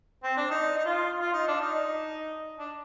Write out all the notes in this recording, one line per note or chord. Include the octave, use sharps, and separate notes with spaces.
C4
D4
D#4
D#4
F4
F4
D#4
D4
D#4
D4